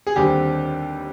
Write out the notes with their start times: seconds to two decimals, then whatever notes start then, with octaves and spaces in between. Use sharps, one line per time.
0.07 G#4
0.16 D#2 D3 G3 C4 G4